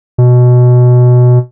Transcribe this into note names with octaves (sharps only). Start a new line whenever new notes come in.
B2